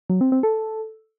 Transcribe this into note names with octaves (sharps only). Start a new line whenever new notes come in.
F#3
C4
C4
A4